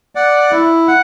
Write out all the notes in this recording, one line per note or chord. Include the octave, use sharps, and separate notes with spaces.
D5 F#5
E4
F#5